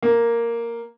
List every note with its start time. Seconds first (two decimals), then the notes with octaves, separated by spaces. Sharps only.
0.03 A#3